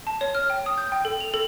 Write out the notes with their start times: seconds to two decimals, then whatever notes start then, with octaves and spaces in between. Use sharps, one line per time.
0.07 A5
0.21 C#5
0.35 F6
0.50 G5
0.66 D#6
0.78 G6
0.92 G5
1.05 A4
1.20 F7
1.34 A4